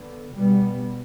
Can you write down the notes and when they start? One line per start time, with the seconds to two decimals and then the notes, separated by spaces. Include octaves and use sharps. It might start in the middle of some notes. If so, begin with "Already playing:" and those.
Already playing: D3 B3
0.35 B2 G3 B3